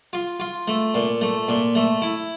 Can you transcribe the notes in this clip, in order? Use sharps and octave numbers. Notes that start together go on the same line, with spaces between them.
F4
F4
A3
A#2
A3
A#2
A3
E4